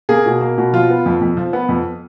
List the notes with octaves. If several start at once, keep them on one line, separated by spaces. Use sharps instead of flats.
A#3 G#4
B2
A#3
B2
F3 F4
B3
F2
F2
F3
B3
F2